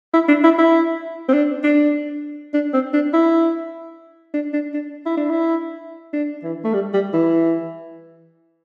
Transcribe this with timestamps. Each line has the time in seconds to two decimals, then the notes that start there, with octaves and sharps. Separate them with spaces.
0.14 E4
0.28 D4
0.44 E4
0.58 E4
1.29 C4
1.33 D4
1.63 D4
2.54 D4
2.74 C4
2.93 D4
3.13 E4
4.34 D4
4.53 D4
4.73 D4
5.06 E4
5.17 D4
5.30 E4
6.13 D4
6.43 E3
6.64 A3
6.74 G3
6.94 G3
7.13 E3